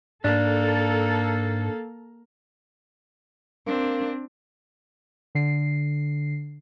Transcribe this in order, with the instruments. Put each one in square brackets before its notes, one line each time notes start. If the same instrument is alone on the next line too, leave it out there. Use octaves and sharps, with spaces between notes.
[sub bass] G#2 [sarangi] A#3 [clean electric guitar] D4 [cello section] A4
[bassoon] A#3 [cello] C4 D4
[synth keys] D3 C7